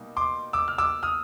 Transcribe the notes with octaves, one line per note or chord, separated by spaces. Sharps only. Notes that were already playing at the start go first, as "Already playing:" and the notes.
Already playing: B2 G3 A#3 D#4
C6 D6
D6 E6
F6
D6 E6
D#6 F6